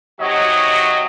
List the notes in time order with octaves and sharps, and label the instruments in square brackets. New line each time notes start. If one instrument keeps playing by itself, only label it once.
[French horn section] C3 F#3 F#4 [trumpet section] D#4 C#5 D#5